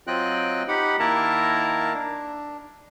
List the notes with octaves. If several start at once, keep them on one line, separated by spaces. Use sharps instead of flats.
F#3 C4 F4 D#5 G5 F#6
D#4 G4 F#5 B5
D#3 A#3 E4 A#4 A5 A#5
D4